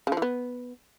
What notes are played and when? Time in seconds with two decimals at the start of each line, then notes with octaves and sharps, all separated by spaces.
0.07 C#3
0.12 F3
0.17 E3
0.22 B3